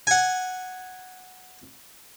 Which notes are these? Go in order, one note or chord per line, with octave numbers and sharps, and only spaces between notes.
F#5 G#5